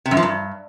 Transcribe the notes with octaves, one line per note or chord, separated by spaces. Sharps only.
C3
F#2
F3
G2